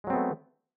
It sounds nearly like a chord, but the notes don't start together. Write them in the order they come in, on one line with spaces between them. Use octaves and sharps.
G#3 F#3 C4 B3 A3